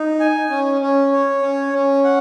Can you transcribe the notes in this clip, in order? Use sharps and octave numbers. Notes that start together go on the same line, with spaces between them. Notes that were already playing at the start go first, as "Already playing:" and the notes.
Already playing: D#4
G#5
C#4
C#4
C#5
C#4
C#4
F#5